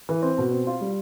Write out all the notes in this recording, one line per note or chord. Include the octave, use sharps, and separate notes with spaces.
E3
C4
B2
C4
F4
G3